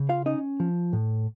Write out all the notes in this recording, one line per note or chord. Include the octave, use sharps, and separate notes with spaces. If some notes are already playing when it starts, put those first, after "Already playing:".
Already playing: C#3
F4 F5
C#4 D#4 D#5
F3
A2